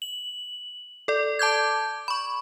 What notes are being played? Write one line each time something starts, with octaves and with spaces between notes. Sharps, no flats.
F#7
A4 D5
A5 D6 G6 G#6
B5 C#6